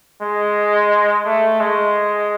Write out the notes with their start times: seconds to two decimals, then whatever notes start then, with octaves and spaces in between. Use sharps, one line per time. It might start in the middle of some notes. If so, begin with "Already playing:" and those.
0.22 G#3
1.26 A3
1.60 G#3